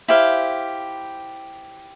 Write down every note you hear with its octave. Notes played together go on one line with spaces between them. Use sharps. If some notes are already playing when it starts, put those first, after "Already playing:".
E4 G4 C5 F5